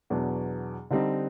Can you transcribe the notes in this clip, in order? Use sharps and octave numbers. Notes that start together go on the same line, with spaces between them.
E2 B2 F#3 B3 D4
D3 G3 C4 D#4